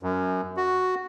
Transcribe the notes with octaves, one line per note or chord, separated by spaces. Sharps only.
F#2
F#4